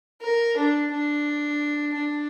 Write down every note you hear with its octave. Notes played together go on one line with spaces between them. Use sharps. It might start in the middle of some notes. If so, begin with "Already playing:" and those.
A#4
D4
D4
D4